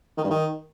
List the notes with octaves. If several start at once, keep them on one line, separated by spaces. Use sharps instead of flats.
D#3
G2
D#3